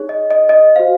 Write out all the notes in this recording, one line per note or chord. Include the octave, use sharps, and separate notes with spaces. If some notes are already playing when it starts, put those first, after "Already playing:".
Already playing: D#4 G#4 C#5
D#5
D#5
D#5
F#4 C5 F5